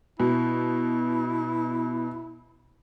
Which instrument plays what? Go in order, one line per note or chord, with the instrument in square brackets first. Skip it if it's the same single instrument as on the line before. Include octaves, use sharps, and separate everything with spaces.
[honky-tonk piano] B2 [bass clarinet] E4